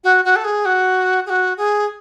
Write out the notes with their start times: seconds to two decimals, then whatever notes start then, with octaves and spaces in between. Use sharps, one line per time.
0.04 F#4
0.25 F#4
0.36 A4
0.44 G#4
0.65 F#4
1.26 G#4
1.29 F#4
1.57 G#4